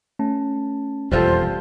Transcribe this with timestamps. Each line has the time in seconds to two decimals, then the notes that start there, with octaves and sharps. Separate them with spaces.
0.19 A3 C#4 A5
1.11 E1 F2 G3 F4 A4 C5